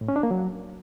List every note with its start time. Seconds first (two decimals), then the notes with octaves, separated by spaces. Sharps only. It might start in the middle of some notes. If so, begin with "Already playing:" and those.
0.01 A2
0.08 C#4
0.16 D4
0.23 A#3
0.31 F#3